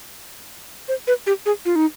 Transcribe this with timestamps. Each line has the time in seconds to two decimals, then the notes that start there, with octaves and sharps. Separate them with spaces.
0.88 C5
1.07 B4
1.27 G4
1.46 G#4
1.65 F4
1.76 D#4